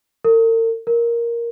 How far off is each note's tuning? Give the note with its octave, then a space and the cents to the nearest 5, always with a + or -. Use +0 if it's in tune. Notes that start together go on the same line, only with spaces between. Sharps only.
A#4 -45
A#4 +5